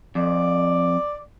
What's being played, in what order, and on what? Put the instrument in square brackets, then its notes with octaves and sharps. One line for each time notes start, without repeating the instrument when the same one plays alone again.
[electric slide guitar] F2 [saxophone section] D5